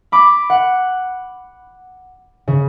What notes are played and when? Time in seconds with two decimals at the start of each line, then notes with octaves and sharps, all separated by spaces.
0.12 B5 D6
0.50 F#5
2.47 C#3